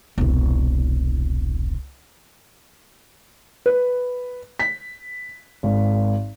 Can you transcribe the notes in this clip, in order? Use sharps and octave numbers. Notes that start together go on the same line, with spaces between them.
E1 C2
B4
B6
G#1